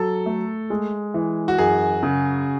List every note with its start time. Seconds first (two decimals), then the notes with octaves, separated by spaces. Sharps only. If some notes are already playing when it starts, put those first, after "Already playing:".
Already playing: F#3 A4
0.26 A3
0.70 G#3
1.14 E3
1.48 F#4
1.58 F#2 G#4
2.03 C#3